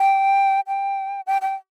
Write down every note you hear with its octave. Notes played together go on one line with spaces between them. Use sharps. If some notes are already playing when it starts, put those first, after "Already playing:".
Already playing: G5
G5
G5
G5